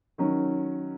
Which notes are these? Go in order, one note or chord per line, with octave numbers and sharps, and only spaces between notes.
D#3 F#3 C#4